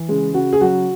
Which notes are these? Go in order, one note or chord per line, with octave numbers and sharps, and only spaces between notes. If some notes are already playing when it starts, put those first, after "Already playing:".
Already playing: E3
C#3 G#3
C#3 F#4
G#4
F#3 F#4